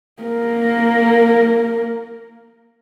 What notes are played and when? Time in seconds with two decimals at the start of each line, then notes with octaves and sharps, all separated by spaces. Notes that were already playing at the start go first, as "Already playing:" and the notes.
0.22 A#3 A#4